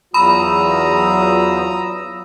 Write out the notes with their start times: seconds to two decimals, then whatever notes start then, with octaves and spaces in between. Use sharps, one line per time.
0.14 E2 F#3 F4 A#5 B5 D#6 E6